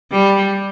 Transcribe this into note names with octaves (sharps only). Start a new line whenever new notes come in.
G3